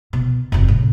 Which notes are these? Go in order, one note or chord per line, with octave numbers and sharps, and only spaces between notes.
B2
F#1 F2
A2 C3